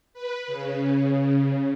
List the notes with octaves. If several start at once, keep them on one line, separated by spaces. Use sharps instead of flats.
B4
C#3